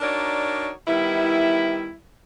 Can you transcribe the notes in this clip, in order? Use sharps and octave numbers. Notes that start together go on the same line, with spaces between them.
D4 D#4 F#4 A#4 C#5 D5
D#3 G3 B3 E4